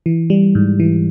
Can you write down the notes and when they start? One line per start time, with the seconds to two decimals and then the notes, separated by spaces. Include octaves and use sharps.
0.06 E3
0.30 G3
0.55 G#2
0.80 E3